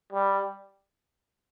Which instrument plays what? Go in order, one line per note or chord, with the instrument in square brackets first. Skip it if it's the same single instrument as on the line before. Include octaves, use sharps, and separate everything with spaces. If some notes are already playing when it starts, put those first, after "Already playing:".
[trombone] G3